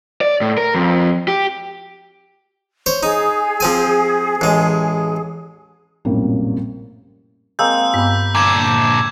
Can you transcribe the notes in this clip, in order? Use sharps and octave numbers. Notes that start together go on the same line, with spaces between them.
D5
A2
A#4
F2
G4
C5 C#5
D#4 G#4
F3 C4 G#5
A1 G#3
A#1 F#2 A2 C3 G3 A#3
G#3 A#3 C4 E6 G6
G2 B3 G4 B5 B6
A#2 D3 D6 G#6 E7